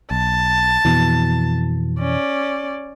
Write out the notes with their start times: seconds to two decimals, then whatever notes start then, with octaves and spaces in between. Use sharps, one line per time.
0.11 B1 A5
0.85 F2 B2 E3
2.00 C#4 D5